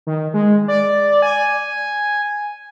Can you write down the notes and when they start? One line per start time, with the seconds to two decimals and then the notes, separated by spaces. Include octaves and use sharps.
0.07 D#3
0.34 G#3
0.68 D5
1.22 G#5